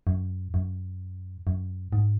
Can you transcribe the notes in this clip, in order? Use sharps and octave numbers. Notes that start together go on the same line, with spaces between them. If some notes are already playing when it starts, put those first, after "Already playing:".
F#2
F#2
F#2
G#2